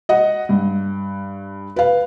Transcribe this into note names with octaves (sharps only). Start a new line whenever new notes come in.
D#5 F#5
G2
B4 F5